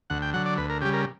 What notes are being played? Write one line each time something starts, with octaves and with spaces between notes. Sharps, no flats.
D2 F#5
G5
D3 F#3 F#5
D5
D2 B4
A#4
C#3 G3 G4
A#4